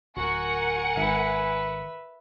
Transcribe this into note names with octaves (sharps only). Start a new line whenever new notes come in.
D1 F#4 A#4 F#5 G#5 C#7
G#1 B4 E5